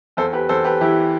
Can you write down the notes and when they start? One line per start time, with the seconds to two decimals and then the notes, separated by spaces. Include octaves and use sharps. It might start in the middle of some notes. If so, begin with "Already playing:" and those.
0.17 E2 A4 C5
0.33 G4 B4
0.49 E2 A4 C5
0.65 G4 B4
0.81 E3 E4 G4